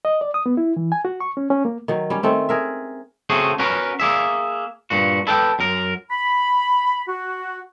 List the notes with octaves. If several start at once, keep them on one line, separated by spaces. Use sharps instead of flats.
D#5
D5
D#6
B3
E4
E3
G#5
F#4
C#6
C#4
C#4
A#3
D#3 F#3
G3 C#4
D#3 A3 C4 C#4
G#4 A#4 E5
C#3 A3 C4 F#4 G#4
C#4 F#4 A#4 B4
A#3 G#4 E5
G2 A#2 F#4
E4 A4 B4 G5
F#2 A#4
B5
F#4